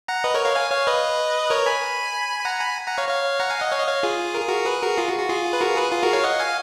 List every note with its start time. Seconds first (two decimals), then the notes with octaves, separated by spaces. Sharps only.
0.08 F#5 A#5
0.24 B4 D#5
0.34 A#4 C#5
0.45 C#5 F5
0.56 F5 G#5
0.71 C#5 F5
0.87 B4 D#5
1.50 A#4 C#5
1.66 G#5 B5
2.40 B5
2.45 F#5 A#5
2.61 G#5 B5
2.87 F#5 A#5
2.98 C#5 F5
3.08 C#5 F5
3.40 F#5 A#5
3.50 F5 G#5
3.60 D#5 F#5
3.71 C#5 F5
3.80 D#5
3.87 C#5 F5
4.03 F4 G#4
4.34 A#4
4.41 G#4
4.48 F#4 A#4
4.66 G#4 B4
4.82 F#4 A#4
4.98 F4 G#4
5.08 F#4
5.18 F#4
5.29 F4 G#4
5.53 B4
5.61 F#4 A#4
5.76 G#4 B4
5.92 F4 G#4
6.03 F#4 A#4
6.13 C#5 F5
6.24 D#5 F#5
6.40 F5 G#5